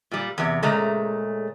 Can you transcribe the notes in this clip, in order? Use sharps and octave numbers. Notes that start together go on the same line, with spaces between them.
A#2 G3
E2 C3
A#2 C#3 G#3 A3 A#5